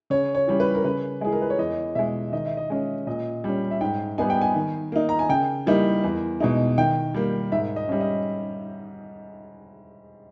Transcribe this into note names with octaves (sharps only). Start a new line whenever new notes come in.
C#3 C#5
C#5
E3 G3 C#4
B4
A#4
C#3 B4
E3 G#3 G#4
A#4
B4
C#5
E2 D#5
B2 G#3 E5
D#3 D#5
E5
D#5
G#3 C#4
A#2 D#5
G3 C#4
E5
G#2 G5
G3 B3 D#4 G#5
G5
G#5
D#3
A#3 D#4
A#5
G#5
C#3 G5
E3 G3 A#3 D#4
E2
B2 G#3 D#4
D#3 G5
G3 A#3
G#2 E5
D#5
G3 C#4
D#5